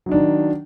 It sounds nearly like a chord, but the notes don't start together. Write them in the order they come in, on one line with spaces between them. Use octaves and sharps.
F#3 D#4 D4 D#3